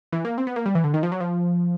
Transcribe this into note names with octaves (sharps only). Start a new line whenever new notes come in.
E3
A#3
C4
B3
A#3
G3
E3
D3
D#3
F3
F#3
F3